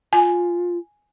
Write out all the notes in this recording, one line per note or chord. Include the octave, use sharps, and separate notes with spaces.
F4 G#5